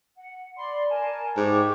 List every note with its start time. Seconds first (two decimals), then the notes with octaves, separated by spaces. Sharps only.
0.16 F#5
0.57 D5 B5 C6
0.89 A#4 G#5 A5
1.37 G#2 G4 C#6 D6